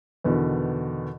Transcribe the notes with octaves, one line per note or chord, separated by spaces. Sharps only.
E2 B2 D3 D#3